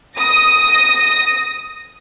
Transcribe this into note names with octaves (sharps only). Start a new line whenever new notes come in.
D#6 A#6